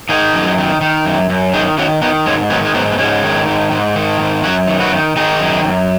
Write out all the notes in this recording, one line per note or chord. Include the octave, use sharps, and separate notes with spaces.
D#3 D#4 G#4
F#2
D#3
D#3
F#2
F#2
D#3 D#4 G#4
D#3 C#4 F#4
D#3 B3 D#4
G#2 G#3 C#4
D#3 F#3 B3
G#3
G#2 F#3 B3
B3
G#2 G#3 C#4
D#3
G#2
G#2
D#3
G#2
F#2 C#4 F#4
D#3
F#4 B4
D#3
D#3 D#4 G#4
F#2
F#2